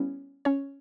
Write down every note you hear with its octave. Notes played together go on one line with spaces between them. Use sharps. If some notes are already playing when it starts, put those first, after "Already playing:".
Already playing: G3 B3 C#4 E4
C#4 C#5